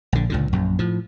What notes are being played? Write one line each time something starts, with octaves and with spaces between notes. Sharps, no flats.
A#1 D3
C#2 A#2 D3
A#1 F#2
A2 F3